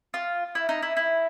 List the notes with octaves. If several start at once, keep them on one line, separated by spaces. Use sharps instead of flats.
F4
E4
D#4
E4
E4